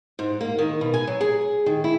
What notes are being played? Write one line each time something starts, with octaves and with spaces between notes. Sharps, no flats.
G#2
A#3
D#3
B2
G#5
F#3
G#4
D#3
E4